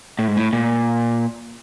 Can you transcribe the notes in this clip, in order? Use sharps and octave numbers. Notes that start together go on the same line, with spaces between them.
A2
G#2
A2
A#2